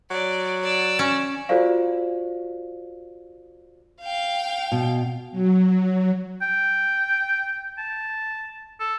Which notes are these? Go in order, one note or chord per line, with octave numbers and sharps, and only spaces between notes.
F#3 D5
D5 E6
C#4
F4 F#4 A4 C5 D5 F5
F5 G5
B2
F#3
G5
A5
A4